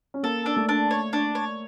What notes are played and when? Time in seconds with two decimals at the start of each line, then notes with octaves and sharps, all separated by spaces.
0.14 C#4
0.23 A#3 A4
0.46 D4
0.56 A3
0.69 D4
0.91 C#5
1.13 D4
1.35 C#5